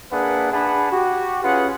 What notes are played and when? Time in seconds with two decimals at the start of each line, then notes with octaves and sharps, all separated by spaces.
0.11 A#3 D4 G#4 B4 E5 F#5
0.52 D4 G#4 B4 F#5 A5 B5
0.91 F#4 G4
1.43 C#4 F4 G#4 B4 F#5